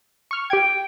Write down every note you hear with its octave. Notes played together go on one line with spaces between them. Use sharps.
C#6 F6
G4 G5 G#6